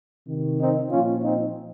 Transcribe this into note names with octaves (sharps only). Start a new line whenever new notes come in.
C3 D#3
C4 D#4
A#2 F3 C#4 F4
C4 D#4